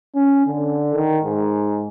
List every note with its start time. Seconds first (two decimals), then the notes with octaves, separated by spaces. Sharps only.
0.15 C#4
0.46 D3
0.94 D#3
1.24 G#2